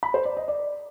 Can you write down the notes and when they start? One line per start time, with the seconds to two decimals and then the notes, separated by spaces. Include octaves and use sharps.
0.03 B5
0.14 C5
0.25 D5
0.37 D#5
0.48 D5